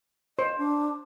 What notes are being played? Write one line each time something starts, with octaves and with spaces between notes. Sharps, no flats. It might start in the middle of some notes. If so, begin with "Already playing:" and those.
C5 D#5
D4